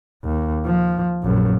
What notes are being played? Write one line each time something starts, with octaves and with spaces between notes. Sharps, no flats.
D#2
F3
A#1 F#2